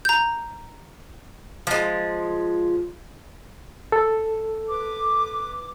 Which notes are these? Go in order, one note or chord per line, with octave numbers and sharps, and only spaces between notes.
A#5 G6
F3 G#3
A4
B4 D6